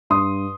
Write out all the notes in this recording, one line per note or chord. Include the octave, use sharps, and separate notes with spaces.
G2 C6 D#6